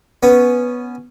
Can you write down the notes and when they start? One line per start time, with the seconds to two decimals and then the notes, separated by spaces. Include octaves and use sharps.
0.23 B3 C#4